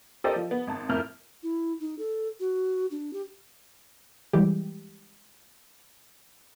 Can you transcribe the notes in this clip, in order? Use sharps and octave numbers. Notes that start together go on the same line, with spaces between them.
G4 A4 A#4 C5 D5 D#5
F3
B3
G#1 A5
F2 A2 E4 A#4 F6 G6
E4
D#4
A4
F#4
D4
G4
E3 G3 G#3 G4